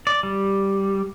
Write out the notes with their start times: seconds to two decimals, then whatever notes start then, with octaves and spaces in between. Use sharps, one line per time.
0.07 D5
0.23 G3